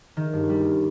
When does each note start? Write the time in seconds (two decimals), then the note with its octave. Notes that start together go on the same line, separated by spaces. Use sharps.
0.17 D#3
0.33 G2
0.49 G3